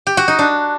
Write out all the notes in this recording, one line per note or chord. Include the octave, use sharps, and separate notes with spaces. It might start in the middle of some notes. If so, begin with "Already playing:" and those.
G4
F#4
D#4
D4